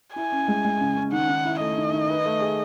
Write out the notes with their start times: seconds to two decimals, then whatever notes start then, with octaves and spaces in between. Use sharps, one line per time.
0.16 E4 G#5
0.32 C#4
0.48 G#3
0.65 G#3
0.81 C#3
0.97 C#4
1.12 D#3 F#5
1.29 D#3
1.45 E4
1.60 A3 D#5
1.77 D#3
1.93 D#3
2.10 B4
2.25 A3
2.41 G#4